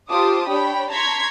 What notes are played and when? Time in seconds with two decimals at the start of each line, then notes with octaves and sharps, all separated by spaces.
0.10 F4 G4 C5 A5 D6 D#6
0.48 D4 C#5 G5 B5
0.91 A5 A#5 C6 C#6 G#6 B6